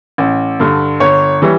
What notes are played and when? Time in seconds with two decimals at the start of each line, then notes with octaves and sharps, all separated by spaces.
0.18 A1
0.60 G2 D3
1.00 G1 C#5
1.42 E3 G3